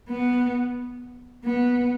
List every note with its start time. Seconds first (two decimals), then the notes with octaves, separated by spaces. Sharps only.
0.10 B3
1.45 B3